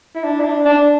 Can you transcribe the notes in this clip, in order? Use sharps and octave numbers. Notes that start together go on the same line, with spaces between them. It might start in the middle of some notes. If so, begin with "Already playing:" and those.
E4
D4
E4
D4
D4